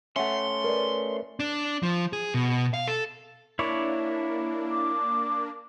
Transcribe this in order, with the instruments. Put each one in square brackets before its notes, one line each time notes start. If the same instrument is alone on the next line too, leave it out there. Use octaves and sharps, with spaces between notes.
[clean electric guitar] A3 C#4 [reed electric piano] E5 F#5 [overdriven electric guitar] C6
[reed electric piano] A#4 B4 D5
[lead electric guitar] D4
F3
G#4
B2
F5
A4
[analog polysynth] A#3 D4 [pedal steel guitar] E4 C#5 D5
[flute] D6